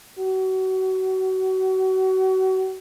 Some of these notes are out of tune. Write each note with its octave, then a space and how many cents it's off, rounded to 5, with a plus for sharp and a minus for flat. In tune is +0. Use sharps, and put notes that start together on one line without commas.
F#4 +30